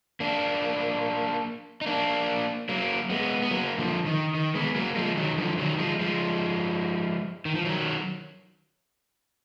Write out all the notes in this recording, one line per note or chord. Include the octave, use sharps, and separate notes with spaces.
A#3 D4
D#4
A#3 D4
F#3 A#3
G#3 B3
B3
F#3 A#3
D3 F3
D#3
D#3
G#3 B3
F#3 A#3
F3 G#3
D#3 F#3
D3 F3
D#3 F#3
F3 G#3
F3 G#3
D#3
F3
D#3 F#3